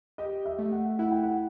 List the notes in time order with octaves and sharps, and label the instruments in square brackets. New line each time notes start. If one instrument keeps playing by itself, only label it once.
[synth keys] G4 [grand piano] D#5
[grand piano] E5
[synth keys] A3
[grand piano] F#5
[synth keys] E4 [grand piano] F#5
[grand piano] G5
F#5